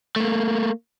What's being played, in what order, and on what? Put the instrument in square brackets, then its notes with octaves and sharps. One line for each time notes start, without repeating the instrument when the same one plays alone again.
[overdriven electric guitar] A3 A#3